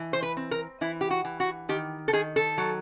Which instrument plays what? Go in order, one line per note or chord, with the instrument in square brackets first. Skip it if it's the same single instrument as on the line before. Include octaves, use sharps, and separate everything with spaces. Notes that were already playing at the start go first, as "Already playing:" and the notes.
Already playing: [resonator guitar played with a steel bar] E3
C5
B4
C4
A#4
E3 E4
G4
F#4
E3
F#4
D#3 G4
A4
D#3 G#4
A4
F#3